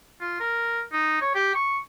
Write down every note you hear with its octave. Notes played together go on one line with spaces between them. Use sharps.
F4
A#4
D#4
C#5
G4
C#6